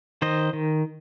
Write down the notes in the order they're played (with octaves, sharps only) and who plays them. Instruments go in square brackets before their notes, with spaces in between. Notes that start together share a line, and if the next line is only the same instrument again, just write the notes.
[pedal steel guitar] D#3 C5 D#5
D#3